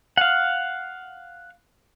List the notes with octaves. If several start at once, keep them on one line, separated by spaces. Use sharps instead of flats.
F5 F#5